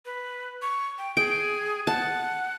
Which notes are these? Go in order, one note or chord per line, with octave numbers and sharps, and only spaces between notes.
B4
C#6
G5
G#4 G5
F#5 A5